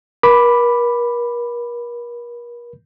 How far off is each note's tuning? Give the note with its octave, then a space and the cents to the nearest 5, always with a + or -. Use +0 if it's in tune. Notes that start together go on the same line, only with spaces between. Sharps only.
A#4 +40 B5 +0 D6 +0